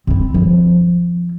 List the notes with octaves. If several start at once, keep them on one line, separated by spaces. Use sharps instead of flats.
C4 E4
F3